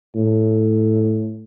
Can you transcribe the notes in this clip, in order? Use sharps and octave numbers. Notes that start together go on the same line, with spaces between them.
A2